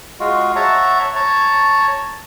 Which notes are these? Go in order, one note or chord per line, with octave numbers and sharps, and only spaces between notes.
G#3 F4 F#4
C#5 E5 F#5 A5 A#5
C#5 A5 A#5